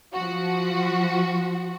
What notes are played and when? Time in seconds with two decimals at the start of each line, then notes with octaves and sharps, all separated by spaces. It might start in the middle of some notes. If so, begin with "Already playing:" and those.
0.14 F3 F#4